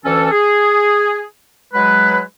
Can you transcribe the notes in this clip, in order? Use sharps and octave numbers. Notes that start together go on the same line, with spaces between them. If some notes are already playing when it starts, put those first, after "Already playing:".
D2 E3 C#4 A4
G#4
F#3 G#3 B4